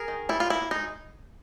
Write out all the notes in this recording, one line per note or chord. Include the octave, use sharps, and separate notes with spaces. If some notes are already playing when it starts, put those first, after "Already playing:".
Already playing: G#4 A#4
D#3
G3 E4
F4
A#3 E4
G#3 D#4